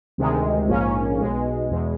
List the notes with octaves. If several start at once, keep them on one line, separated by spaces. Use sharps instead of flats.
D2 C3 D#3 G#3
A#1 G#2 F3 A#3 C#4
B1 B2 G#3
E2 B2 G#3